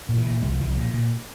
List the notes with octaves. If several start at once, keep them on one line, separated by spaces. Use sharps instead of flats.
A#2
E3
A#2
C2 G3
F3
C2 E3
F3
A#2
A#2